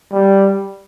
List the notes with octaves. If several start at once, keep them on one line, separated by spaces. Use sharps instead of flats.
G3